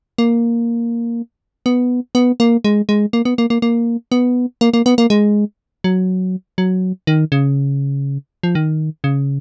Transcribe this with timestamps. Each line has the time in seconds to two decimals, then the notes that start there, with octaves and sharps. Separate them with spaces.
0.18 A#3
1.66 B3
2.15 B3
2.40 A#3
2.64 G#3
2.89 G#3
3.13 A#3
3.25 B3
3.38 A#3
3.50 A#3
3.62 A#3
4.12 B3
4.61 A#3
4.74 A#3
4.86 B3
4.98 A#3
5.10 G#3
5.84 F#3
6.58 F#3
7.07 D#3
7.32 C#3
8.43 F3
8.55 D#3
9.04 C#3